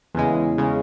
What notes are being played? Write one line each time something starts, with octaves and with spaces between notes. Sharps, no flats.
E2 C#3 G#3
C#3 G#3